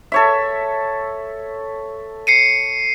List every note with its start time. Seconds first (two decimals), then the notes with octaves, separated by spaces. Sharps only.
0.12 A4 C#5 E5
2.27 C7 C#7 D#7